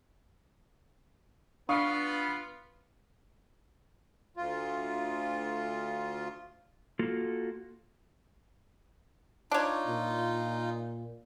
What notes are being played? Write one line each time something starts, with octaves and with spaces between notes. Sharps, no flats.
B3 D4 F4 F5 C#6 D#6
D2 F4
A#3 F4 F#4 A4
D4 D#4 F4 C#5
A#2